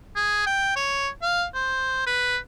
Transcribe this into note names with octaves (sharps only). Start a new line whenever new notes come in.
G#4
G5
C#5
F5
C5
B4